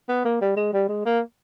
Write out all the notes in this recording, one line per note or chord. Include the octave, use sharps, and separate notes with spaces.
B3
A#3
G3
G#3
G3
G#3
A#3